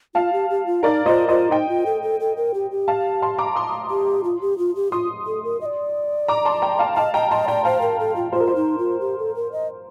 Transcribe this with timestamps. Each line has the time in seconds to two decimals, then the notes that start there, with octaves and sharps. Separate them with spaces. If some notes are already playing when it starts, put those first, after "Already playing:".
0.15 F4 F5 A5
0.33 G4
0.50 G4
0.66 F4
0.83 D#4 A#4 D5
1.06 F4 C5 D#5
1.28 F4 C5 D#5
1.51 D#4 D#5 G5
1.69 F4
1.86 A4
2.02 A4
2.20 A4
2.37 A#4
2.54 G4
2.71 G4
2.88 F5 A5
3.22 A5 C6
3.38 A#5 D6
3.56 C6 D#6
3.90 G4
4.24 F4
4.41 G4
4.58 F4
4.76 G4
4.92 F4 C6 D#6
5.27 A4
5.44 A#4
5.61 D#5
5.66 D5
6.28 A#5 D6
6.45 A5 C6
6.62 G5 A#5
6.79 F5 A5
6.96 D#5 F5 A5
7.14 D#5 G5 A#5
7.30 D#5 A5 C6
7.48 D5 G5 A#5
7.65 C5 F5 A5
7.81 A#4
7.99 A4
8.16 F4
8.32 F4 C5
8.40 A#4
8.48 C5
8.56 D#4
8.78 F4
9.00 G4
9.19 A4
9.35 A#4
9.52 D#5